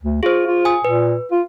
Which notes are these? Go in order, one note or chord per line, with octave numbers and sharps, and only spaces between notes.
D2
F4 G#4 C5
F4
G#5 D#6
A#2 B4
F4